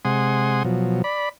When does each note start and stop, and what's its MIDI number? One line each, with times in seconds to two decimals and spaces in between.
0.05 0.63 48
0.05 0.63 56
0.05 0.63 78
0.05 0.63 80
0.05 0.63 84
0.05 0.63 87
0.65 1.02 47
0.65 1.02 53
0.65 1.02 54
1.04 1.29 74
1.04 1.29 83